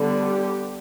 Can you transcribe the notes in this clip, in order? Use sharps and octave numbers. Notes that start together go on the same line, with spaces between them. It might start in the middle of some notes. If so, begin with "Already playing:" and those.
Already playing: D3 G3 B3
G4